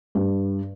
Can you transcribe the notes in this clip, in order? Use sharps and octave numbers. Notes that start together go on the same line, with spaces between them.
G2